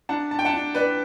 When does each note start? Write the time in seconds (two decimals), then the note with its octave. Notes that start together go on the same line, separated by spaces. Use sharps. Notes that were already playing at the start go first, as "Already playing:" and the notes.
0.09 D4 F#5 A5
0.31 A5
0.39 G5
0.45 F#5 A5
0.53 D4
0.75 B4 D5